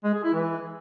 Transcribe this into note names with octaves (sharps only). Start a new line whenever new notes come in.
G#3
G#4
E4
E3